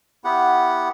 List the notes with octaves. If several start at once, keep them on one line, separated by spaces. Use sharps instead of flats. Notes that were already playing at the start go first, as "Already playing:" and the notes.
B3 E4 G4 F#5